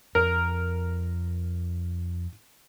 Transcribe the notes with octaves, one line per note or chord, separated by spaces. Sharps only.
F2 A#4